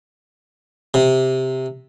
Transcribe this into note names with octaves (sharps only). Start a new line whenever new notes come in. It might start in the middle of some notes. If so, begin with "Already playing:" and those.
C3